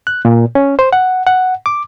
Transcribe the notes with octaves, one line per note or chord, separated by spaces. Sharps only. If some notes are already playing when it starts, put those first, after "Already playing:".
F#6
A#2
C#4
C5
F#5
F#5
D6